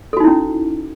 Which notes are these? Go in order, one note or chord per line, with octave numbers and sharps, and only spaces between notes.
C#4 D#4 E4 F#4 A4